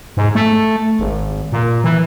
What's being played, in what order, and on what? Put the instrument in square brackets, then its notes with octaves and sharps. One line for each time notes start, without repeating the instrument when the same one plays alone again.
[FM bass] G#2
A3
G#1
A#2
E3